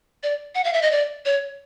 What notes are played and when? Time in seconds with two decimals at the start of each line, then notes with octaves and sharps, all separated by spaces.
0.23 D5
0.55 F#5
0.64 F5
0.73 E5
0.82 D#5
0.91 D5
1.25 C#5